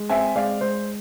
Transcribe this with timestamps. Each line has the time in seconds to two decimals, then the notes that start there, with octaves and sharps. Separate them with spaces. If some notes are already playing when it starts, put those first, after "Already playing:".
Already playing: G#3
0.09 C4 E5 G#5
0.36 G#3 D5 F5
0.61 G#3 C5